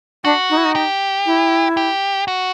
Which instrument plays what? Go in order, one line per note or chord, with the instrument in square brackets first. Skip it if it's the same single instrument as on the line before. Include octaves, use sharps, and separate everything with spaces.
[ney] D4 [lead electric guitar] F#4
[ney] D#4
E4
D#4
[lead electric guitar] G4
[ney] E4
[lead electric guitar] G4
F#4